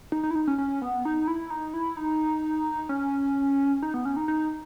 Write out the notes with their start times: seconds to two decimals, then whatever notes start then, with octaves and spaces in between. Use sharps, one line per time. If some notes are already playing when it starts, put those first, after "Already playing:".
0.12 D#4
0.23 D#4
0.31 E4
0.35 D#4
0.47 C#4
0.58 C#4
0.82 B3
1.05 D#4
1.28 E4
1.50 D#4
1.74 E4
1.97 D#4
2.89 C#4
3.83 D#4
3.94 B3
4.05 C#4
4.17 D#4
4.28 D#4